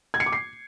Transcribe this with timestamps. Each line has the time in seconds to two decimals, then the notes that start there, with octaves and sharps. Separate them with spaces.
0.14 G#6
0.20 C#7
0.26 D6
0.32 C7